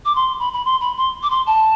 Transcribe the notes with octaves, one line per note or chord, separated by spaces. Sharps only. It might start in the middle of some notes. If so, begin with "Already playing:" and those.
D6
C6
B5
B5
C6
B5
C6
D6
C6
A5